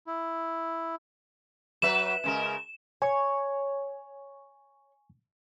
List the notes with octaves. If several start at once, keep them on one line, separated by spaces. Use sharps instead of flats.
E4
F#3 B4 E5 E7
C#3 G#3 A#4
C#5 G#5 C#6